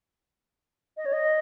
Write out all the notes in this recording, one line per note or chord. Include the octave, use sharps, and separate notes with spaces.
D#5
C#5
D#5